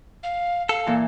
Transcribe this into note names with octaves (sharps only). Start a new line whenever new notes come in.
F5
A4 F5
A#2 E3